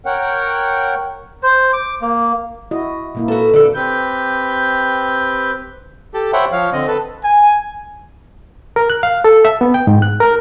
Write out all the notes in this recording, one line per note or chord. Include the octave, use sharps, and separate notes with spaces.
A#4 C#5 F#5 G5
C5
D6
A#3
E4 F#4 D#5
A#2 A#3 E4
F#4 A4 B4
D3 A4 B4 D5
C4 G4 B4 G6
G4 A4
C5 C#5 E5 F#5 G5 B5
F3 C#5 F5
D3 C4 D#5
A4 B4
G#5
A#4
F#6
F5
A4
E5
B3
G5
G#2
F#6
A#4